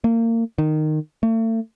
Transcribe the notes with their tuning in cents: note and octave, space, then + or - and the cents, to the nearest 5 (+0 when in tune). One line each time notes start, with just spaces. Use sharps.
A#3 -30
D#3 -15
A3 +40